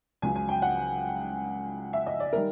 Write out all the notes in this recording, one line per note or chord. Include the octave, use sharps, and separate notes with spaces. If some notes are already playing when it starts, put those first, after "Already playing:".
C#2 C#3 F#3 G#5
G#5
G5
F#5
E5
D#5
D5
D#3 G3 A#4